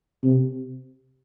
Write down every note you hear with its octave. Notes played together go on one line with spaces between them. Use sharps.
C3